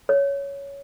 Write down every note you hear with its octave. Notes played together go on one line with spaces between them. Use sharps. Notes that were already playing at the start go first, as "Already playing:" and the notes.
C#5